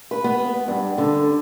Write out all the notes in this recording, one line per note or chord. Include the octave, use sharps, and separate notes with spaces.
B4
B3
G2
D3